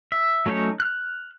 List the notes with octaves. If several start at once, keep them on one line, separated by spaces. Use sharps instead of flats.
E5
F#3 A3 C#4 D#4 C#5
F6 F#6